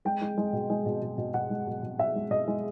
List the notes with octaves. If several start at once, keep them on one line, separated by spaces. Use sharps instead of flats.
G#3 G5
G#3
G#3
B2
G#3
B2
B2
B2
B2 F#5
G#3
B2
B2
B2 E5
G#3
B2 D#5
G#3